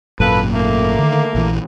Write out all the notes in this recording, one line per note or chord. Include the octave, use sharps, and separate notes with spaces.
G#1 F#2 A#2 A#3 A4 B4
A3 A#3
D3 D#3
A#1 E3